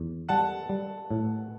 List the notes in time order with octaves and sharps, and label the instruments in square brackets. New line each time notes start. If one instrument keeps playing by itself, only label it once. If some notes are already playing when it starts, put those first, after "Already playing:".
Already playing: [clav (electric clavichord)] E2
[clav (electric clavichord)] G3 [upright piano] F#5 A5
[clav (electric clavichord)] G3
A2